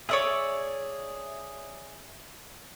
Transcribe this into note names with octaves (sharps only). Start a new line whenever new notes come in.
G#4 C#5 D5 E5 D#6 E6